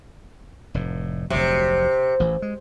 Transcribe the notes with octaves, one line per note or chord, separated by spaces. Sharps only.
F1 A2
F1 D2 C3 F#3
A1 E3
G#3